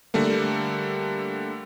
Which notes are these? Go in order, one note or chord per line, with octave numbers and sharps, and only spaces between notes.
D3 G3 A3 A#3